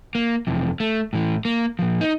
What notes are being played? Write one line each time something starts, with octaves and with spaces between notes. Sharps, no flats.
A#3
F2 C3 E3
A3
A2 E3
A#3
A#2 F3
D#4